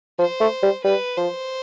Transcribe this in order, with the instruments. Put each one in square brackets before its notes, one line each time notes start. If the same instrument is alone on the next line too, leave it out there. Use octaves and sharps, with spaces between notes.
[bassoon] F3 [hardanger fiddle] C5
[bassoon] A3
G3
[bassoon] G3 [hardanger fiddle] B4
[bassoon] F3 [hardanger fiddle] C5